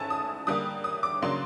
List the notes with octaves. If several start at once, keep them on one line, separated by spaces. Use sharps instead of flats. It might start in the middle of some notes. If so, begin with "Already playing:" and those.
Already playing: G#2 A3 C#4 E4 G#5 A5
D#6
D3 G3 A#3 D#6
D#6
D6
C#3 F#3 A#3 D4 C6